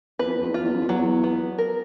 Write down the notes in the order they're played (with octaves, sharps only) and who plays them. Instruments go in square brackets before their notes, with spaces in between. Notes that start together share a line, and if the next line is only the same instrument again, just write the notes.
[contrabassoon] E2 [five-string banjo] B4
[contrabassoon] F2
E2
F2
E2
[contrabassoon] F2 [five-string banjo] F4
[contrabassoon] E2
F#2
F2
[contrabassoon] E2 [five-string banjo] F#3
[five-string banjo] B3
A#4